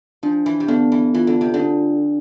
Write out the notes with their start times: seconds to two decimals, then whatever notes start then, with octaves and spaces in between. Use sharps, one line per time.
0.23 F3 D4
0.46 E3
0.60 C3
0.68 D3 B3
0.92 E3
1.14 E3 F4
1.27 D3
1.41 C3
1.54 D3
1.60 D4